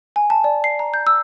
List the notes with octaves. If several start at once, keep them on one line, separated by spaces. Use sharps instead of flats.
G#5
A5
D5
C7
A#5
G6
E6